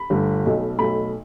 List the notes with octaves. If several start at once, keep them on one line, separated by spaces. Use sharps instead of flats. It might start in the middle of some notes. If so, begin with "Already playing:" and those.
Already playing: B5
G1 G2 D3 A3
B1 B2 A3
B1 B2 A3 B5